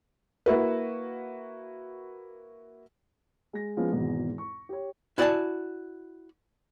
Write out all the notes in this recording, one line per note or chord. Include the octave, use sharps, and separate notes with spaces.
A#3 E4 F#4 B4
G#3 A#6
F3 G#3 B3 C#4
G#1 E2 G#2 B2
C#6
G4 C#5
E4 F#4 D5 E5 G#5 A5